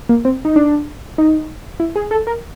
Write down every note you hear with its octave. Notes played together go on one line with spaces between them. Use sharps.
A#3
C4
D#4
D4
D#4
E4
G#4
A4
A#4